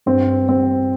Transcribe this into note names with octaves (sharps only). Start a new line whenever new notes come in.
G2 C4
G3 C4